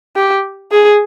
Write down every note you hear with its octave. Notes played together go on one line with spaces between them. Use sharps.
G4
G#4